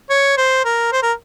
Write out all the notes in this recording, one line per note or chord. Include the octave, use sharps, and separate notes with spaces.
C#5
C5
A#4
C5
A#4